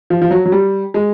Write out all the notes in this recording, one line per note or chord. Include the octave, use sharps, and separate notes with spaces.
F3
F3
F#3
F#3
G3
G#3